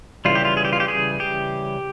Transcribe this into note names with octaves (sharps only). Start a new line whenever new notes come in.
C#3 E3 G3 F4
G4
F4
G#4
G4
F4
G4
G#4
G4